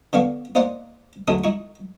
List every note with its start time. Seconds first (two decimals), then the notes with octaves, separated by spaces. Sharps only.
0.13 D3 B3 D5 F5 C#6
0.55 A#3 D#4 C5 D5 F#5
1.28 D3 F#3 G#3 A3 D#6
1.44 D#4 E4 C#6